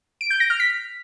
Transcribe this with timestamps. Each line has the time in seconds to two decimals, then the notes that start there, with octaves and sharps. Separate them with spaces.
0.21 D7
0.30 G6
0.40 A#6
0.50 F6
0.60 B6